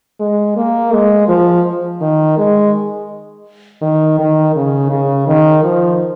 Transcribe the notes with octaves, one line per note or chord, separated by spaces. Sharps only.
G#3
A#3
G#3
F3
D#3
G#3
D#3
D#3
C#3
C#3
D#3
F3